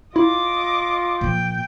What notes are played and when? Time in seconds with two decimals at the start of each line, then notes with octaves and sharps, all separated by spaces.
0.16 E4 F4 D#5 D6
1.21 A#2 F3 G5